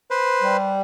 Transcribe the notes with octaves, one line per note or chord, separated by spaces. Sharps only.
B4 C5
G3